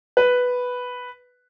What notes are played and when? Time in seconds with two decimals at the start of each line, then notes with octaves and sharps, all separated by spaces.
0.17 B4